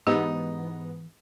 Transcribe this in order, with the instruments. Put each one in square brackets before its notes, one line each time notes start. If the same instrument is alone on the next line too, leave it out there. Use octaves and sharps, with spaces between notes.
[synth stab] G#2 B3 [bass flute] E3 [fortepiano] D#4 [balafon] G4